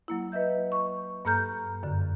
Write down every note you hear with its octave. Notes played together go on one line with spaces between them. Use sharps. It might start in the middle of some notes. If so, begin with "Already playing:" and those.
F#3 A#3 E4
B4 D#5 E5 G6
C#6
G2 A#3 A4 A#5 F6 G6
F#2 D3